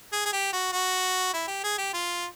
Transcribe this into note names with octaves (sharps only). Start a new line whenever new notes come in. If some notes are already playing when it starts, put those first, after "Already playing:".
G#4
G#4
G4
F#4
F#4
E4
G4
G#4
G4
F4